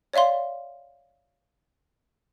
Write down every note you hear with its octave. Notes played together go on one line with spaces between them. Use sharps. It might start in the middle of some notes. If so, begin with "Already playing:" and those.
C#5 D5 E5 F5 C6